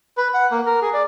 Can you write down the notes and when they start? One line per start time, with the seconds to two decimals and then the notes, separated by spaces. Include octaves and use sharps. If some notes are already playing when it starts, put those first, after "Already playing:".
0.17 B4
0.34 F#5
0.51 A#3
0.66 A#4
0.82 G#4
0.94 D5